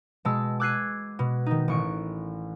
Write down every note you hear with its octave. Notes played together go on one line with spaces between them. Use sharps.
B2 G#3 A5 E6
D6 E6 F#6 G#6 C7 D#7
B2
D#3 D#4
A1 C#6 D7